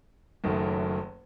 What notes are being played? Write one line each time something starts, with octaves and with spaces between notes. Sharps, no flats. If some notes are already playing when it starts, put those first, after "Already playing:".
F#1 F#2 D#3 F#3 A3